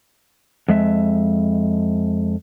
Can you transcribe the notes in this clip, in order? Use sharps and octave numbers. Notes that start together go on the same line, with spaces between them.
F2 G#3 E5